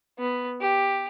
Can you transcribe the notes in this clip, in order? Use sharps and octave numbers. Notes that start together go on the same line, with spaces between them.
B3
G4